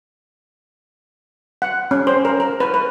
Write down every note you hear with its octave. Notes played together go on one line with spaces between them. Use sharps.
F#5
C#4
C5
A#4
A#4
B4
B4